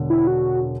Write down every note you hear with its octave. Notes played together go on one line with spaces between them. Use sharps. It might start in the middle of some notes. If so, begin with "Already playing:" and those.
Already playing: E1 D3
E4
F#4